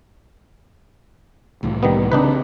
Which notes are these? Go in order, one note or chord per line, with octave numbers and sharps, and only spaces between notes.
C2 A2 E3
D#3 G3 B3
C#3 C4 D4 D#4 B4